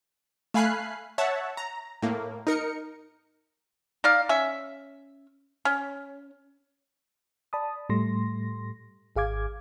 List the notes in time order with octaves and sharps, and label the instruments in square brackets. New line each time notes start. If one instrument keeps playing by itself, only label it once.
[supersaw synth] A3 F5 G#5 B5 F#6 C7
C#5 E5 F#5 A5
A#5
A2 A#3
D#4 A#4 C#7
[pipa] D#4 D5 F5
C#4 E5
C#4
[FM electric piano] D5 A5 B5 D#6
A2 G3 A3 C6 A#6
G#1 G#4 F5 D6 G#6